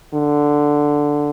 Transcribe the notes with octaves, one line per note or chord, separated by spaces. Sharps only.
D3